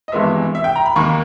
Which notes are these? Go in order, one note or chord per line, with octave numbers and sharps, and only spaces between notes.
D#5
G#1 G2 E3 G#3 B3 E5
E5
G5
A#5
B5
D#2 D#3 A#3 C#6